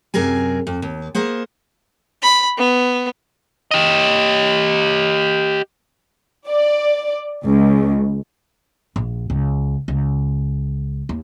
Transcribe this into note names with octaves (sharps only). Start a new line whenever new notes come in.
F#2 C3 G#4 A#4 G#5
F2
D#2
A#3 G#4 C5 F#5
B5
B3
G4 D#5
D5
C#2
A#1
C#2
C#2
D#2